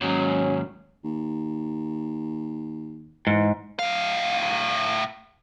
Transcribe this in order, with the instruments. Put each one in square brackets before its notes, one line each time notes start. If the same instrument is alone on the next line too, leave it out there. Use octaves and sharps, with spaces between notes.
[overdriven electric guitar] D#2 G#2 [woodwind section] F#3 C#4
[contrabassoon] D#2
[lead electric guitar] G#2 [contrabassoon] E3
[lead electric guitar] A2 F5